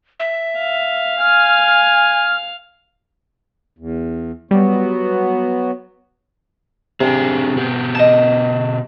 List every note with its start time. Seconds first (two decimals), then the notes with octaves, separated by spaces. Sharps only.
0.20 E5
0.58 F5
1.19 G#5 F6
1.67 F6
3.79 E2
4.51 F#3 G3 B3 F#4
7.01 C3 C4 D4 G#4
7.56 B2 B3 G4
7.95 D#5 A5